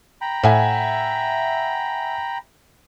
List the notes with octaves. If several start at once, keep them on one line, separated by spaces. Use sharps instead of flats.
G5 A#5 B5
A2 E5 F#5 G#5